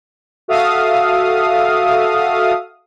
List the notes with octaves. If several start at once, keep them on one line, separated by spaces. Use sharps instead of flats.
F#4 A4 E5 F5 D#6